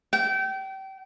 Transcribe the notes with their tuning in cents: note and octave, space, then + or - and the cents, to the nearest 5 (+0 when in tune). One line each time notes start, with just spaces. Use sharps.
G5 -30